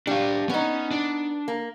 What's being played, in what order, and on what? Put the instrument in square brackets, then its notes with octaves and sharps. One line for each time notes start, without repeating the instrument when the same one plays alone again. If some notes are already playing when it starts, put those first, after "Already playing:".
[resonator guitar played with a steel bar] G3 [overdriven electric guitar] D4 F5
[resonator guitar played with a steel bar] B3 D#4 [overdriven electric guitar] C#4
[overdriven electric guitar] D4
[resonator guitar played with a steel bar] A#3